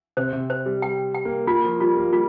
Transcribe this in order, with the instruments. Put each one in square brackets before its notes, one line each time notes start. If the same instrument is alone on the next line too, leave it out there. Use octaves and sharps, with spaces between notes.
[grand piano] C3 [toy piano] C5
[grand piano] C3
[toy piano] C5
[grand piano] G3
[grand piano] G3 [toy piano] G5
[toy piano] G5
[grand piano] A#3
[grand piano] A#3 [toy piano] F4
[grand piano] F3
[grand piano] G3 [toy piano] F4
[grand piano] A#3
[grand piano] G3 [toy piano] F4